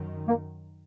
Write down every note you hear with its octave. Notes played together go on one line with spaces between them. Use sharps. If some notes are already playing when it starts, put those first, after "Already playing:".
Already playing: F#2 D#3
A#3